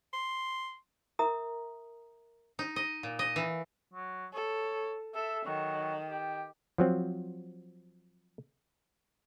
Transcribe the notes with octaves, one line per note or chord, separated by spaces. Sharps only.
C6
A#4 E5 A#5 D#6
D#4
D#5
A#2
D#5
E3
F#3
A4 C#5
A4 E5
D#3 F#3
G4
F3 F#3 C4